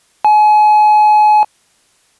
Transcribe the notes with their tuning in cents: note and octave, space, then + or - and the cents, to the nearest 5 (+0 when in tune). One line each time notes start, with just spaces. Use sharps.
G#5 +35